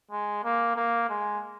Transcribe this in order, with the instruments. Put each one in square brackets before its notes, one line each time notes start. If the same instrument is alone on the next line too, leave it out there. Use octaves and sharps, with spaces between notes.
[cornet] G#3
A#3
A#3
G#3